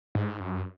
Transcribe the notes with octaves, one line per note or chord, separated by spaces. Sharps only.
G#2
F#2